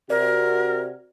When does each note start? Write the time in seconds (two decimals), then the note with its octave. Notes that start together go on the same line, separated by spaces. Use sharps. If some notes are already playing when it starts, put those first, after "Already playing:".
0.10 C3 F#4 A#4 D5